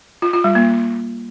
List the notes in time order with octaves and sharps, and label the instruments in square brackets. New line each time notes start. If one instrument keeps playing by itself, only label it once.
[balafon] F4
F4
G3
A#3